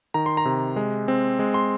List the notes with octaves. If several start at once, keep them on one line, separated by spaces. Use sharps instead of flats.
D#3 A#5
C6
A#5
C3
G#3
C4
G#3
C6